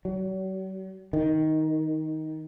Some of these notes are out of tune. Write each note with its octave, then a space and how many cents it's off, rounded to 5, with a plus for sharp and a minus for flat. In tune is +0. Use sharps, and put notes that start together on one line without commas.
F#3 +45
D#3 +10